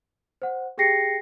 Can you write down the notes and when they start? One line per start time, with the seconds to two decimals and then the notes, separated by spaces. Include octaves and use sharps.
0.42 C5 F#5
0.78 G4 G#4 G5 A#6 C7 C#7